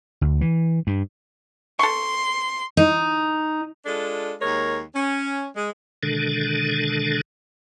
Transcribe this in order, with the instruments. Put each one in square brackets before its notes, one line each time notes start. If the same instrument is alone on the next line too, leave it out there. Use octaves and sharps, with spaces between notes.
[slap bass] D2
E3
G2
[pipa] A4 C#6 [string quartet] C6
[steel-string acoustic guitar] D#4
[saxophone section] G#3 D4 F4 A4
D#2 G#3 A#4 C#5
C#4
G#3
[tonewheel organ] B2 D3 D#3 G#3 D4 A4